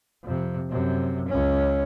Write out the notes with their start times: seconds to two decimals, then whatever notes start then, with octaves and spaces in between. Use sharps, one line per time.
0.23 F2 C3
0.69 F#2 C3
1.28 C#2 C#4